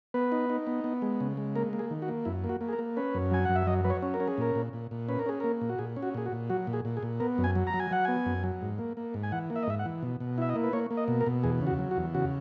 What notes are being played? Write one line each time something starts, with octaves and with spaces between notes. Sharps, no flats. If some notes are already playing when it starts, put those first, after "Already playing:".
B3 B4
D#4
D#4
B3
B3
G#3
C#3
G#3
A#3 A#4
A#3
G#4
D#3
F#4
A#3
F#2 E4
A#3
F#4
A#3
G#4
A#4
A#3
C#4 B4
F#2
F#3 G#5
F#2 F#5
E5
F#3 D#5
F#3 B4
C#5
C#4
A#4
C#4
G#4
A#2 A#4
A#2
A#2
A#2
C#4 B4
A#4
C#4 G#4
A#3 A#4
A#2
F#4
A#2 G#4
C#4
F#4
A#2 G#4
F#4
A#2
F#3 F#4
A#2
G#4
A#2
G#4
A#2
B3 A#4
F#2
G#5
F#3
A#5
F#3
G#5
F#3 F#5
B3 G#5
F#2
F#3
G#2
A#3
A#3
G#2
G#5
E3 F#5
A#3
E5
D#5
G#2 E5
F#5
E3
B2
B2
E4 E5
D#5
A#3
B4
A#3 C#5
A#3
D#5
B2
A#4
B2
E2 G#4
C#3
F#4
F#3
F#4
E2
C#3 F#4